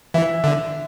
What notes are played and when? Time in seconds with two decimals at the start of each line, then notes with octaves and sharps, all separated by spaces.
0.14 E3 E5
0.44 D3